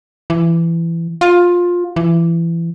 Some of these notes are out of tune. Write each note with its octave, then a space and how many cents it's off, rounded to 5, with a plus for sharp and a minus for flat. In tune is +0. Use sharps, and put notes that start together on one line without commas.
E3 +20
F4 +15
E3 +25